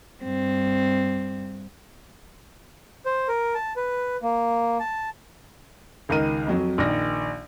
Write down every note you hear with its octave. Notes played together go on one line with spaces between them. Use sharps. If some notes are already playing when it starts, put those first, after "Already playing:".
G2 C4
C5
A#4
A5
B4
A#3
A5
C#2 D#3 A#4 D#7
F2 F#3
A#1 D#3 A#6